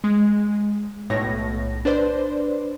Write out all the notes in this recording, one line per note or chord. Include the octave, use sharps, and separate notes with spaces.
G#3
B1 A2 C#5 A#6
D4 B4 C5 D5